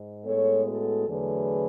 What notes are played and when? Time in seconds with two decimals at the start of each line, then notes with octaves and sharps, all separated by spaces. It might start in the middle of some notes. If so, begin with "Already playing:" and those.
Already playing: G#2
0.25 A2 G#3 B3 A4 C#5
0.66 F#4 A4
1.07 E2 D3 F#3 A3 G#4 B4